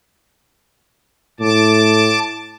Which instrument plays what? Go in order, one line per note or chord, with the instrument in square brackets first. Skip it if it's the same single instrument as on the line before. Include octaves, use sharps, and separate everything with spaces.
[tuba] A2 [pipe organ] A5 D6